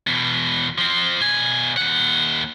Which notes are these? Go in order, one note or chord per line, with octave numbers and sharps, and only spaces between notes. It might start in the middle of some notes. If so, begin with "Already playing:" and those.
E2 B2
F3 C4
B2 G#5
D#2 F#5